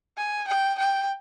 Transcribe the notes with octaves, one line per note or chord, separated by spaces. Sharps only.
G#5
G5
G5